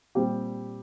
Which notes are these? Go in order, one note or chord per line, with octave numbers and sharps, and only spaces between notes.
A#2 G3 C4 G4